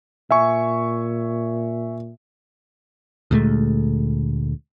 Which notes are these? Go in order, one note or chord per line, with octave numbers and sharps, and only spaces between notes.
A#2 E5 G#5 C#6
D2 A#2 G#3 A3